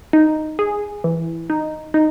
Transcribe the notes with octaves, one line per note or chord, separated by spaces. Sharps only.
D#4
G#4
E3
D#4
D#4